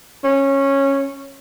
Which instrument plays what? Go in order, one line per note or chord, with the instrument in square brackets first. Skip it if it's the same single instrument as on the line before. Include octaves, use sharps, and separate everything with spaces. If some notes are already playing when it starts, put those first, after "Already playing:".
[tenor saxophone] C#4